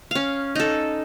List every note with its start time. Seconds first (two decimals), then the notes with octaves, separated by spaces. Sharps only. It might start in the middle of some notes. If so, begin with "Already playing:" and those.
0.11 C#4 F5
0.55 D#4 A4